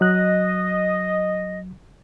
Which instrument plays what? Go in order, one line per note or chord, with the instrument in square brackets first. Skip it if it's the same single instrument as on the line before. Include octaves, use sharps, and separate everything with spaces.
[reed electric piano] F#3 F#6 [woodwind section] D#5